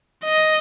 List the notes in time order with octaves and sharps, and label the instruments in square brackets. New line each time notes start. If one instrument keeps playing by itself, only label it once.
[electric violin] D#5